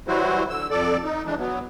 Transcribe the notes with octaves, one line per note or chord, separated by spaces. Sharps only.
E3 F#3 G3 E4 F#4 C5
D3 E6
F2 A4 D5
D#4
E3 G#3 D4
F#3 B3